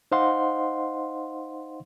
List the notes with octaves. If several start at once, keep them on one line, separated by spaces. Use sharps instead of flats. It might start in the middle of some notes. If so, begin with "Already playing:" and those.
D#4 C5 D#5 F5 F#5 C6